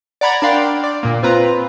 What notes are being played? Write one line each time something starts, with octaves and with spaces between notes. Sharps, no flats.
D5 F#5 A#5 B5 G#6
D4 A#4 D5 F5 G5 C6
D5
A#2 A#3
C4 F4 B4 A#5